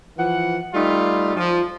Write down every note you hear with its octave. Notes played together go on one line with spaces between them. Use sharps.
E3 F3 F#5
G3 A3 D#4 F4
F3